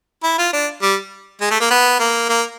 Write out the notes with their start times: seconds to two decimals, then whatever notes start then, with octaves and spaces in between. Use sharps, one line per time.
0.23 E4
0.38 F4
0.53 D4
0.82 G3
1.41 G#3
1.51 A3
1.61 A#3
1.71 B3
2.00 A#3
2.29 A#3